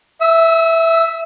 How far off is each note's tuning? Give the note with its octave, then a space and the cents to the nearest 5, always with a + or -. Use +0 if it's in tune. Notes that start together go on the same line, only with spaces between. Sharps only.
E5 +0 E6 -40